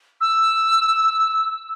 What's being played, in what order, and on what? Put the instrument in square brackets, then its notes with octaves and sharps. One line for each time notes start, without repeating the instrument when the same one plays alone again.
[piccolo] E6